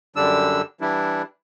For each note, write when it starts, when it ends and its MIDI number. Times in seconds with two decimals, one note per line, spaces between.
0.16 0.62 42
0.16 0.62 50
0.16 0.62 55
0.16 0.62 62
0.16 0.62 88
0.81 1.22 52
0.81 1.22 55
0.81 1.22 62
0.81 1.22 64